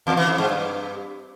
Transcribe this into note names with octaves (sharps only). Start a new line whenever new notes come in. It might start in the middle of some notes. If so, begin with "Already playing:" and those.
E2
E3
F2
G#2
G2